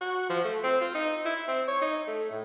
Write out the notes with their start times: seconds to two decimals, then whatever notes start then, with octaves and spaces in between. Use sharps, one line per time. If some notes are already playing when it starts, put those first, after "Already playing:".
0.01 F#4
0.30 F3
0.45 A3
0.64 C4
0.81 F4
0.95 D#4
1.25 E4
1.48 C4
1.68 C#5
1.82 D#4
2.07 A3
2.31 A2